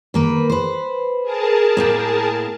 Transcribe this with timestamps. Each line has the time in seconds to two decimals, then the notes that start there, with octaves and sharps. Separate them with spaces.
0.14 D#3 A#3 B4
0.50 B4 C5
1.23 G#4 A#4 A5
1.77 A2 A#3 G5